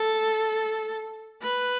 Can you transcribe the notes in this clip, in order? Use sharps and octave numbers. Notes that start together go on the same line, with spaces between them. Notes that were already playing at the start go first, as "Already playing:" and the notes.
Already playing: A4
B4